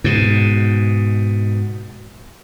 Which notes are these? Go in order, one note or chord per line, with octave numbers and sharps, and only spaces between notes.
G#2 B2